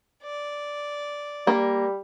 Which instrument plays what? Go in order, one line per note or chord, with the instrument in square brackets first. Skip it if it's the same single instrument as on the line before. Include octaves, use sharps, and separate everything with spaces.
[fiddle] D5
[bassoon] G3 [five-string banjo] A#3